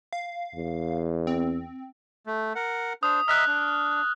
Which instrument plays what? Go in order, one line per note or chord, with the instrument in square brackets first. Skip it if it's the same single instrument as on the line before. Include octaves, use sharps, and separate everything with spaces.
[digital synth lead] F5
[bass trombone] E2
[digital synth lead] C4
[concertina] A3
A#4 F#5
[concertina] D4 C5 [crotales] D#6
[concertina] D#5 E5 A#5 [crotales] F6 F#6
[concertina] D4